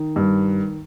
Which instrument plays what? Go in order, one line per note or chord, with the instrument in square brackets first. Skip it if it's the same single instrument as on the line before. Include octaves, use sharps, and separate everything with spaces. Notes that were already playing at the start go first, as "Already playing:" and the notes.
Already playing: [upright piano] D#3
G2